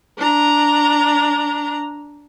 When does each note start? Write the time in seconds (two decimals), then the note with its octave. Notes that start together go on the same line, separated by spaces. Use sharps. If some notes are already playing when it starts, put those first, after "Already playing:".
0.18 D4 A#5